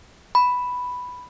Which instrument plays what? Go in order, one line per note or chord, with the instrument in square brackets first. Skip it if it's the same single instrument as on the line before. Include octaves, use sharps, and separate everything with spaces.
[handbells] B5